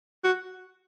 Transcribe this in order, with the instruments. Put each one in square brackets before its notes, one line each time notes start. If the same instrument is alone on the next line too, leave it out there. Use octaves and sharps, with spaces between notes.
[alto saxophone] F#4